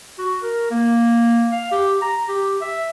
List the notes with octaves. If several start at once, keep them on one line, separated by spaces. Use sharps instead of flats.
F#4
A#4
A#3
F5
G4
A#5
G4
E5